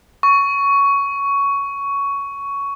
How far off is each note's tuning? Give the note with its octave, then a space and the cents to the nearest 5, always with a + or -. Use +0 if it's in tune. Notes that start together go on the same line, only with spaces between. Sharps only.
C#6 +10